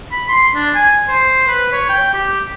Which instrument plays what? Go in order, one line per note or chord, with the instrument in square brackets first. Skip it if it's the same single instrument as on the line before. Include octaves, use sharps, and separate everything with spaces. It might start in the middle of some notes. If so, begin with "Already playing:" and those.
[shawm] B5
C6
D4
G#5
C5
B4
C#5
G5
G4